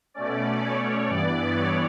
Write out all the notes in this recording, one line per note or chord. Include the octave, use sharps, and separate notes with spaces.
B2 A3 C#4 D5
C#5
G2 E3 B3 D5
C#5